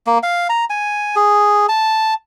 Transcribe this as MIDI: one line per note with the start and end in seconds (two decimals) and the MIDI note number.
0.07 0.18 58
0.23 0.47 77
0.49 0.65 82
0.70 1.15 80
1.16 1.66 68
1.69 2.14 81